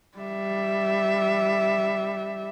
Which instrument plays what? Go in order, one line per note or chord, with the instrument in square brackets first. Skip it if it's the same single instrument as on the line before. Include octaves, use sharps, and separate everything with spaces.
[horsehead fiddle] G3 E5